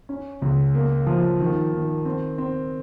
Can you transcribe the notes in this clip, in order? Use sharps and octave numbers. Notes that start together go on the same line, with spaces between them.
C#4
C#2
A#3
F3
D#3
D#3
C4
C4